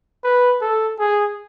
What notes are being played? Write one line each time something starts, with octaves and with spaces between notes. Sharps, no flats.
B4
A4
G#4